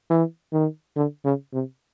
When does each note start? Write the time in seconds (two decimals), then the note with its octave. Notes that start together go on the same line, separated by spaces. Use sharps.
0.10 E3
0.53 D#3
0.96 D3
1.25 C#3
1.53 C3